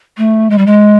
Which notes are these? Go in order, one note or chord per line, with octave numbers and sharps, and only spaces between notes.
A3
G#3
G3
G#3